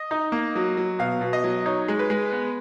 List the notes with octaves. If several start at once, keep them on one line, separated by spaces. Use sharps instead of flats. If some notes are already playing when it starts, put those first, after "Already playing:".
Already playing: D#5
D#4
A#3
F#3
F#3
B2 F5
B2
D#5
F#3
D#4 C#5
G#3
B4
G#3
B3